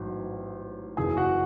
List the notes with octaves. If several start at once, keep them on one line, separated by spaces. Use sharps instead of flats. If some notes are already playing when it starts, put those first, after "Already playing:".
Already playing: A1 G#2 F#3
F#1 F#2 C#3 E3 G#4 G#5
F#4 F#5